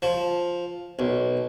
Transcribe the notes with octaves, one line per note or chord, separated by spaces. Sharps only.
F3
B1